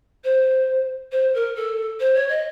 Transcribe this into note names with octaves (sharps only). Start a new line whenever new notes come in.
C5
C5
A#4
A4
C5
C#5
D#5